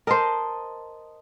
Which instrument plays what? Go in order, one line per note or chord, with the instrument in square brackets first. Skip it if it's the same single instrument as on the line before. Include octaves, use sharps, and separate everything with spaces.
[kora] A#4 C5 [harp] D#5 A5